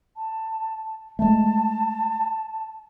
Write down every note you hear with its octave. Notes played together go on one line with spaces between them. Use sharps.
A5
G#3 A3 A5